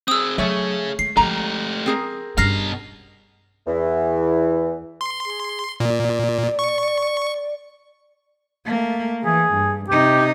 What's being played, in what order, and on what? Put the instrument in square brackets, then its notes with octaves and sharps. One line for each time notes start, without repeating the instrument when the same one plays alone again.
[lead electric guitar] C4 G#4 [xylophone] D#6 E6
[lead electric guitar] C#3 G#4 [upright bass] F#3 [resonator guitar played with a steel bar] A3 C#5 E5
[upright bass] G#3 [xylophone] C7
[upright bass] F3 G#3 [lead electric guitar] A3 G4 [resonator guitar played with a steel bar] A#5
[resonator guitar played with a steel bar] C4 G#4 A#4
[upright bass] G2 C#4 [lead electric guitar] B2 A#5 [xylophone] F6 A#6 C7
[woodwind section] E2 E3
[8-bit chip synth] C6
[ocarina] G#4
[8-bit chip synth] A#2 [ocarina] D5
[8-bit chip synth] C#6
[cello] A3 A#3
[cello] E3 [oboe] G#4
[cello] G2
[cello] C3 D#4 [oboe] G4